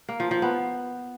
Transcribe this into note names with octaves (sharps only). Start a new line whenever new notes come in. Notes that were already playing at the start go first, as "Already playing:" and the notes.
A#3
F3
F3
B3